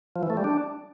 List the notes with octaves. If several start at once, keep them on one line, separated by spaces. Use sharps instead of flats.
F3
E3
A3
G3
D4